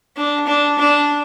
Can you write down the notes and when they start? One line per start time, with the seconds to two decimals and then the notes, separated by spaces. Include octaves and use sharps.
0.17 D4
0.47 D4
0.79 D4